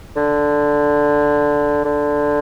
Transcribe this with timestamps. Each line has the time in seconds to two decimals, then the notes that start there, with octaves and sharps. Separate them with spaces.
0.17 D3
1.85 D3